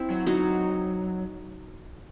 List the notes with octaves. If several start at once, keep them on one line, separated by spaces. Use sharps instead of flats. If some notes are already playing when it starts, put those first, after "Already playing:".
Already playing: C4 E4
F#3
F#3 D#4 F#4